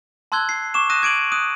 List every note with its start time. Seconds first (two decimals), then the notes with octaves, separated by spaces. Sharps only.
0.32 A5 C6 E6 F#6 G#6 G7
0.49 C7
0.74 C#6 D6 E7
0.90 D#6 F#6 A#6 D#7 E7
1.02 D6 G#6 D7 D#7 F#7
1.32 D#6 F#6 D#7